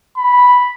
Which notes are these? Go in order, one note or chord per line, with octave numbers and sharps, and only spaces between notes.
B5